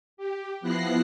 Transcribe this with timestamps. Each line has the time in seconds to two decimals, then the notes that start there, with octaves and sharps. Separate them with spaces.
0.17 G4
0.61 F3 B3 E4 F#6 A#6 C7